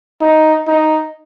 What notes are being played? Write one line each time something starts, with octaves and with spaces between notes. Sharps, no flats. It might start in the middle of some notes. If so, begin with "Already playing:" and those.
D#4
D#4